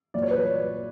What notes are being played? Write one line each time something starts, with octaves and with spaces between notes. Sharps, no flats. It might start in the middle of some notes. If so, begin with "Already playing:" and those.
A#1 A#2 F#3 D5
C#5
B4